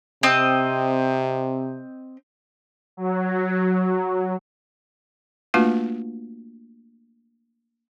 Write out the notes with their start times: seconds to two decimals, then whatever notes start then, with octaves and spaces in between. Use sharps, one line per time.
0.23 C3 C4 D#5
2.97 F#3
5.54 A3 A#3 D4 F4 F#4 B4